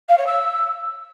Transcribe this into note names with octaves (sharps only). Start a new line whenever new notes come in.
F5
C#5
E6